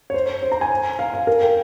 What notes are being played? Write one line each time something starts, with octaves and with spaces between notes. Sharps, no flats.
C#5
C5
C5
A#5
G#5
F5
F5
A#4
G5